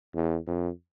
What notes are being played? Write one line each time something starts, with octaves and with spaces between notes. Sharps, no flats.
E2
F2